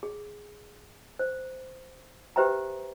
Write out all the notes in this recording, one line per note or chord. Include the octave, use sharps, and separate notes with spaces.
G#4
C5
G4 B4 C5 E5 G5 A#5